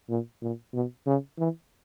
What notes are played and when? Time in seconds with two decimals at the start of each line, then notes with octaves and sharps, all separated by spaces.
0.09 A#2
0.42 A#2
0.74 B2
1.06 C#3
1.38 E3